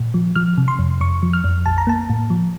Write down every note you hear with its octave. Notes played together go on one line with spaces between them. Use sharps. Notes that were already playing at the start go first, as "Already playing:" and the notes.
Already playing: A#2
F3
F3 F6
C3
C6
F2
F2 C#6
F3
F6
F2
A#1 A5
A#5
A#3 A5
A2
F3